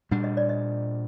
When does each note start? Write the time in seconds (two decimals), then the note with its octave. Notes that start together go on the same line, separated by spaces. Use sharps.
0.11 A#2 G3 D4 F#5
0.24 D#5
0.37 D5
0.49 D#5